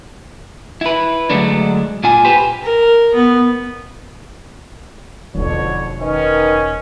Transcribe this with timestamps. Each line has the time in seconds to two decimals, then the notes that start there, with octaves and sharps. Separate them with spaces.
0.81 E4 B4
1.30 D3 F#3 G#3 A3 D4
2.04 A#2 F4 G#5
2.25 G4 B4 C5
2.62 A#4
3.15 B3
5.35 E1 F2 B2 D3 D#4 C#5
6.00 D#3 C#4 B4 D#5